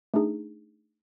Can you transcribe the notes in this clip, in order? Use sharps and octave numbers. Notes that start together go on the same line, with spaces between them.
A3 D4 D#4 G#4